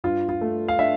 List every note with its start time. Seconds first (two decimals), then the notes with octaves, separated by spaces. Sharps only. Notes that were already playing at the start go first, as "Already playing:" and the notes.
0.04 G2 F4
0.29 F4
0.41 A3
0.68 F5
0.79 D4 E5